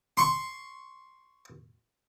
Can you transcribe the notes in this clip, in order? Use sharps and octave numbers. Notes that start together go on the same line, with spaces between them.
C6 C#6